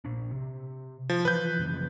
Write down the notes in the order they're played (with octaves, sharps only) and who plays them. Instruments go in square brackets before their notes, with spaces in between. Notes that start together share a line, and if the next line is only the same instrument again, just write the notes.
[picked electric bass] A#2 D4
C3
[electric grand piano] F3
[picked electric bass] E3 F3 [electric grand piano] B4 G6
[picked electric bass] F#2 C#3 F3